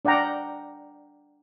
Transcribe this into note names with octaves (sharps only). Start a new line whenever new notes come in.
D4 D5 F#5 G5 A#5